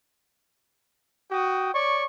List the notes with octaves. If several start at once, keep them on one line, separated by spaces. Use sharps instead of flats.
F#4 G5 D#6
C#5 D5 C#6